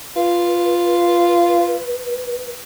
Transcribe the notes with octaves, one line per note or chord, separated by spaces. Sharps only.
F4 B4